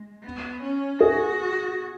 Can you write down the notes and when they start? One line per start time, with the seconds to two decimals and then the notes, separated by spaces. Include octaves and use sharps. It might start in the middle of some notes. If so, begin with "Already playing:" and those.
Already playing: G#3
0.24 B3
0.63 C#4
1.01 F#4 G#4